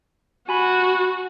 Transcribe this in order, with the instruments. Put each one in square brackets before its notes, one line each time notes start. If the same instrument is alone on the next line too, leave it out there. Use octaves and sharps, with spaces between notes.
[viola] F#4 [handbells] G#5 B5